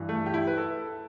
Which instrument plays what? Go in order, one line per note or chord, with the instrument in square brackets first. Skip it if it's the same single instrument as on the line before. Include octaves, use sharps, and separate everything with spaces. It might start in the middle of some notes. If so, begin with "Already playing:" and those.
Already playing: [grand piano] G2 E3
A3
G4
E4
B4
A4